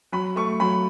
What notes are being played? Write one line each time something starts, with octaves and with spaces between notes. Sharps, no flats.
F#3 B5
A3 C#6
F#3 B5